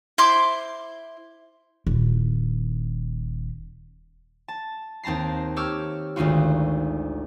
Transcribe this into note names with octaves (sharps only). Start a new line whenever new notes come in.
E4 C5 C6 D6
D#1 E4
A5
D#2 C4 A5 A#5 C7
G4 C#5 D6 E6 F6
G#1 D2 D#3 D#4 F4 F#4